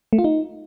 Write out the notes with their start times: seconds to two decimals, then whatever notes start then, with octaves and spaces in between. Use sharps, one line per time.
0.13 A3
0.19 F4
0.24 D#4